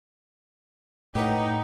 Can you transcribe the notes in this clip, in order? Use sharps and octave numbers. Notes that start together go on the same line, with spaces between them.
A2 D#4 G4 B4 F#5